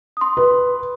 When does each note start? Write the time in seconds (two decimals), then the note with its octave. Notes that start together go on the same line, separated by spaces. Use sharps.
0.17 C6 D#6
0.37 B4